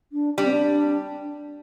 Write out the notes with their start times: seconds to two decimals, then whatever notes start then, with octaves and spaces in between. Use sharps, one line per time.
0.12 D4
0.38 G3 D4
0.45 C4
0.53 D4